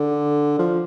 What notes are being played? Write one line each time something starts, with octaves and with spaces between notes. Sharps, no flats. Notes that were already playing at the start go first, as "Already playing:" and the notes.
Already playing: D3
F3